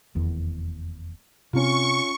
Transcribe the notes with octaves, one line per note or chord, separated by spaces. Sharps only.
F1 E2 D#3
C3 C4 C#4 F4 C#6